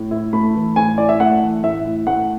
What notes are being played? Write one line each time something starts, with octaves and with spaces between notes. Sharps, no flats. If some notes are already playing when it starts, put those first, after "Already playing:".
Already playing: A2
E4
A3 B5
E3
A2 G#5
E4 D5
E5
A3 F#5
E3
A2 E5
E4
A3 F#5